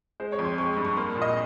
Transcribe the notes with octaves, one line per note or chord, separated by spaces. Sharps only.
G#3 C5
C#5
F2
C6
G#3 C#6
G2
C#6
A#3 C6
A#2
D#5